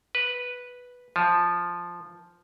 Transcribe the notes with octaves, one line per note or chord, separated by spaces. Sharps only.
B4
F3